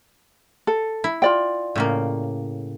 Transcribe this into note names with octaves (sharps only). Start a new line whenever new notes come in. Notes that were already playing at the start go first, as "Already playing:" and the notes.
A4
E4
F4 D5 G5
A2 C#3 A#3